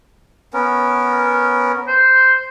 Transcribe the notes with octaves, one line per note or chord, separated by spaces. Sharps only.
B3 C#4 A#4
C5